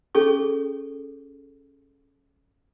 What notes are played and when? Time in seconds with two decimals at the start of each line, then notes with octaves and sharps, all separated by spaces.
0.15 C#4 G#4 A4 C#6